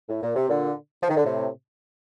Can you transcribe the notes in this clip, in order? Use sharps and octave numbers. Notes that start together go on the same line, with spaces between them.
A2
A#2
C3
A#2 D3
F3
D#3
D3
A2 C3